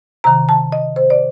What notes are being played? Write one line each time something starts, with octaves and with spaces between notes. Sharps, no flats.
C3 D#3 A#5
A5
D#5
C5
D5